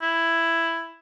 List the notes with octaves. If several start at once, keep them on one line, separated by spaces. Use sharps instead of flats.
E4